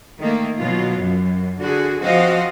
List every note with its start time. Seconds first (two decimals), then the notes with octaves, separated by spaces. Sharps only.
0.20 D#3 A3 A#3
0.60 B2 F#3 F4
0.99 F#2
1.60 D3 F#4 G#4
2.01 F3 C4 F#4 C5 D#5 F5